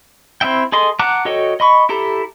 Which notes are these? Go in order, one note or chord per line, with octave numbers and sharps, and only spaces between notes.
C4 E4 E5 G5
G#4 A4 D#5 C6
F#5 A5 A#5 D6 F#6
F#4 A4 C#5 D#5 G5
D#5 B5 C#6
E4 G4 A4 A#5